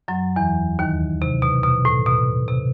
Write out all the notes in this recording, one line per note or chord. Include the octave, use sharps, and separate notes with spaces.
F#2 F#3
E2 E3
D#2 D#3
C3
B2
B2
A2
B2
C3